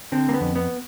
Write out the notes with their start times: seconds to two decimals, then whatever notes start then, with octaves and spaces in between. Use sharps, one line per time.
0.12 D3 C4
0.29 A#3
0.34 B3
0.41 F2
0.55 B3